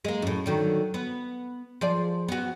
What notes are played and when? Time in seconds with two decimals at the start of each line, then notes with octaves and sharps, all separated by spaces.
0.05 G#3 A#3
0.22 F#2 A2
0.46 D3 D#3 F#3
0.94 B3
1.81 F3 G#4 D5
2.28 B3 F#4